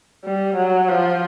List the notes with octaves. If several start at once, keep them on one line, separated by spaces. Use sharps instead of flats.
G3
F#3
F3